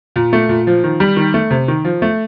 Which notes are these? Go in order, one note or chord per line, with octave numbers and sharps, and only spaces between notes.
A#2
A3
A#2
F3
D#3
G3
D#3
A3
C3
D#3
F3
A3